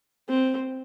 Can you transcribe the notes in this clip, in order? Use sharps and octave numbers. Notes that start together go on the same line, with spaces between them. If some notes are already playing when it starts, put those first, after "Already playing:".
C4